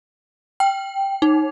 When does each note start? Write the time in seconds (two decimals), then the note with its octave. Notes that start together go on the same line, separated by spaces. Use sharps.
0.60 G5
1.22 D#4